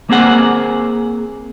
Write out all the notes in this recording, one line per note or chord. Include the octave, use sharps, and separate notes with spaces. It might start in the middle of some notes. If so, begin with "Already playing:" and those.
A#3 C4 G#4 F#5